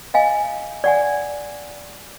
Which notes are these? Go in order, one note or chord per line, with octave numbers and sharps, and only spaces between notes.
D#5 F5 G#5
D5 F#5 G#5